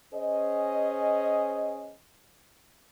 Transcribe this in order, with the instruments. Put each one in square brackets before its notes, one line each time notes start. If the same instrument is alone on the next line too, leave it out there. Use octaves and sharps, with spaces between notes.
[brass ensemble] C#4 G#4 C5 D#5